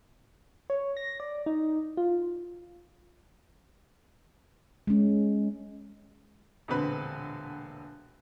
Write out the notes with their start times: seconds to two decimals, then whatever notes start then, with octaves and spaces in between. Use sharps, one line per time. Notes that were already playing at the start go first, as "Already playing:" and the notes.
0.70 C#5
0.97 A#6
1.20 D5
1.46 D#4
1.97 F4
4.87 G#3 C#4
6.68 E1 A#1 D3 C4 B4 B5